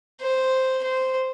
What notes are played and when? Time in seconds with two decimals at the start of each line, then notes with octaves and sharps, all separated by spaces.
0.21 C5
0.84 C5